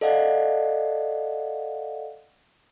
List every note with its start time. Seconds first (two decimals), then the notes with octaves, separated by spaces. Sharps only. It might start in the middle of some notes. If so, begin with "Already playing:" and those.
0.01 A4 D5 D#5 F5 F#5